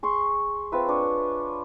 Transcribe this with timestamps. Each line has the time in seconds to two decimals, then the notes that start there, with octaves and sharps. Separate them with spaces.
0.03 G#4 C6 C#6
0.72 C4 F4 B4 E5
0.88 D4 C#5